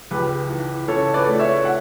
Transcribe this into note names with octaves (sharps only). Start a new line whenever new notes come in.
C#2 G4 B4
E3
C#3 A4 C#5
B4 D5
A3
C#5 E5
F#5